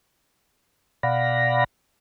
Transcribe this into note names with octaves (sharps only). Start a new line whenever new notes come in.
B2 D5 F5 F#5 B5 A#6